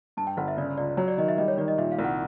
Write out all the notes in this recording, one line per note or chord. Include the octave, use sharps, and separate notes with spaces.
G2 A5
G5
G1 F#5
E5
C#3 D5
C#2 D5
F#3 C#5
D5
D#3 D#5
E5
G3 D#5
C#5
D#3 D5
D#5
A#2 E5
F5
C2
F#5